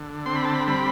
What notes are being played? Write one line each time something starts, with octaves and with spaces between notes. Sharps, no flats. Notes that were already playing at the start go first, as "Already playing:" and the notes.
Already playing: D3
C4 C6
B5
A5
B5
G3 B5